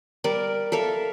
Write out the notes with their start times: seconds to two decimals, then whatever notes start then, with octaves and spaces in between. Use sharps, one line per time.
0.24 G3 A#4 D5
0.72 A4 A#4 E5 F5